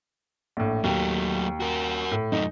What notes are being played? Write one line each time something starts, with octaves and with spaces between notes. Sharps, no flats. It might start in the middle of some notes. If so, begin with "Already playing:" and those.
A#1 A2
D#2 F#3 A3
F#4 A#4
A2
F#2 A3 D#4